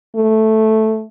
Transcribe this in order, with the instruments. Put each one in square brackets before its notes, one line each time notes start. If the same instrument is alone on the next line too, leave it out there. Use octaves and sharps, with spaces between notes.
[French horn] A3